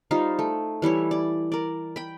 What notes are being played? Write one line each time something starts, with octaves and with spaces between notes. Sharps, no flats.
G3 D#4 F4 C5
A3
E3 G3 E4 C#5
D5
A#4 D5
G5 B5